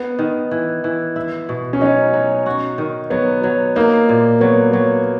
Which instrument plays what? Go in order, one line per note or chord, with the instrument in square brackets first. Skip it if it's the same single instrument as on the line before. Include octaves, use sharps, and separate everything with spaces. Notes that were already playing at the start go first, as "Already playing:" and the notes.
Already playing: [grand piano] B3
[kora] D#3
E3
E3
E4
B2
[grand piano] C#4
[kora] F#3 [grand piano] D#4
[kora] F#3
F#4
D#3
[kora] F#3 [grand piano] B3
[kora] F#3
[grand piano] A#3 [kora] D#4
[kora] A#2
[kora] F#3 [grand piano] B3
[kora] F#3